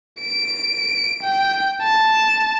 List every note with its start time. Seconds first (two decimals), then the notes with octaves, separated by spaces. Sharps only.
0.21 D7
1.23 G5
1.83 A5